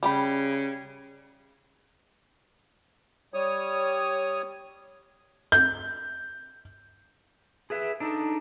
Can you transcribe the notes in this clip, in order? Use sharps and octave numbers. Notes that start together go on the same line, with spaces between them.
C#3 G3 G5 B5
G3 C#5 D#6
G6
G#4 B4 E5
D4 D#4 A4